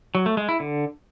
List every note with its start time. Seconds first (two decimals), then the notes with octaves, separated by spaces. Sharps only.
0.15 F#3
0.26 A3
0.37 G#3
0.49 E4
0.60 D3